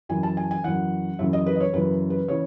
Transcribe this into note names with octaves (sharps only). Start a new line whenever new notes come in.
F#2 E3 G#5
A5
G#5
G#5
F#2 E3 F#5
F#2 C#3 E3 E5
D#5
B4
D#5
C#5
F#2 C#3 E3 B4
B4
C#3 E3 C#5